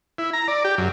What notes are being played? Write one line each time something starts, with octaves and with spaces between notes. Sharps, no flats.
E4
A#5
D5
G4
F#2